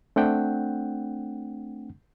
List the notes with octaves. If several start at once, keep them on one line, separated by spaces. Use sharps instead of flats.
A3 C4 D4 F#5 G5